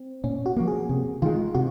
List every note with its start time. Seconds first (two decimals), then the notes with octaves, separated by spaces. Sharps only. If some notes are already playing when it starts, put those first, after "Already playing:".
Already playing: C4
0.24 A#2 C#4
0.46 F#4
0.56 F3 A#3
0.67 G#4
0.89 C3
1.22 D#3 G#3 F4
1.54 C3 F#4